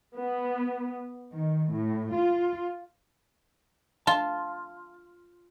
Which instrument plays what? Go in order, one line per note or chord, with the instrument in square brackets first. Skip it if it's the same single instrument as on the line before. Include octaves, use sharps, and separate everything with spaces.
[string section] B3
D#3
A2
F4
[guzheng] F4 [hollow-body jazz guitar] A5